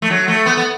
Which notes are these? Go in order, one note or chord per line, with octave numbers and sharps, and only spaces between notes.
A3
F#3
A3
B3
B3